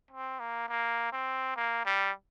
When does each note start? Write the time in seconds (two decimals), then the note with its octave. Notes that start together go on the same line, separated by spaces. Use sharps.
0.11 C4
0.40 A#3
0.69 A#3
1.12 C4
1.56 A#3
1.85 G3